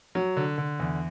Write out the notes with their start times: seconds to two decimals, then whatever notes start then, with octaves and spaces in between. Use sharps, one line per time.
0.15 F#3
0.37 D3
0.58 D3
0.80 E2